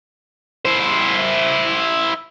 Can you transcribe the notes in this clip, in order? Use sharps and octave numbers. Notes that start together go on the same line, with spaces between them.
E4 C5